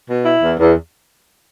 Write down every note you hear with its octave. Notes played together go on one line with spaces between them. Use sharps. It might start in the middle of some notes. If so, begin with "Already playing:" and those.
B2
E4
E2
E2